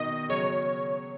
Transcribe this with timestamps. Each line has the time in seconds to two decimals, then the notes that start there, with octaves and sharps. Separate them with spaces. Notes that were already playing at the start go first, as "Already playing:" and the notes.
Already playing: B2 D#3 D#5
0.29 C#3 F#3 C#5